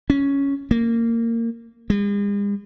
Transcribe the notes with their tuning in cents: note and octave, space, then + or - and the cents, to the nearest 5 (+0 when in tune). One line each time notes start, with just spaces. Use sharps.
C#4 +5
A#3 -20
G#3 -45